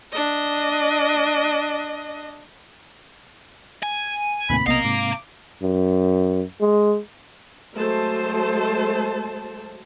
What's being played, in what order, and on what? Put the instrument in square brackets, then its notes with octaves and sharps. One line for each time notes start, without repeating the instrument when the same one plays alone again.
[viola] D4 D#5
[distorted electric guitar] G#5
[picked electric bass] D#2 A2 [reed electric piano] C3 A#3 C4 [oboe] B5
[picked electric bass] B1 B3 [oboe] D#5 [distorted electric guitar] F5 A#5
[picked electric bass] G#2 [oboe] D6
[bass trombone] F#2
G#3
[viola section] F#3 G#3 A3 C5 A5